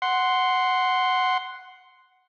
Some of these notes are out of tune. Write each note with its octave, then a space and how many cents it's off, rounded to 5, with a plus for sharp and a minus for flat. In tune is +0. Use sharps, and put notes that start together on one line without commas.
F#5 +0 C6 +0